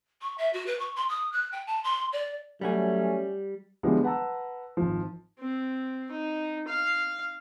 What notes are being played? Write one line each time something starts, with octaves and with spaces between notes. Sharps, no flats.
C#6
E5
F#4
B4
C#6
C6
D#6
F#6
G5
A5
C6
D5
F#3 G3 A3 C#4 F#5 G#5
D3 E3 F3 G3 G#3 B3
B4 F#5 A5 A#5 E6
G#1 F3
C4
D#4
F5